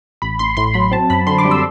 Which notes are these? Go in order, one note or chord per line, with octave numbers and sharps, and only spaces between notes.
A1 B5
A1 C6
A2 C6
F#3 B5
C4 A5
F#2 B5
D3 C6
D6
G3
E6